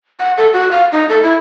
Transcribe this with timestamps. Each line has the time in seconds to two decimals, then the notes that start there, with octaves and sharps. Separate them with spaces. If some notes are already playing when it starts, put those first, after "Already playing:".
0.20 F#5
0.37 A4
0.53 F#4
0.71 F5
0.92 D#4
1.09 A4
1.23 E4